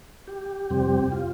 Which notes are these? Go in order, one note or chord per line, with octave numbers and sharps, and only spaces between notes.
G4
F2 C3 G3 C4
F4